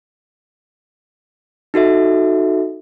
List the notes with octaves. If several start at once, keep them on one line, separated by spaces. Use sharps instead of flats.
D#4 F#4 A4 E5